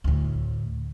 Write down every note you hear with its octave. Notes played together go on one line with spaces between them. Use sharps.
D2 A2